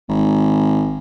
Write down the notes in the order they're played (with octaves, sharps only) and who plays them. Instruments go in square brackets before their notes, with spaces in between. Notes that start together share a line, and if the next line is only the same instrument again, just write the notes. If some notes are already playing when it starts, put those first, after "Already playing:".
[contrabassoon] G#1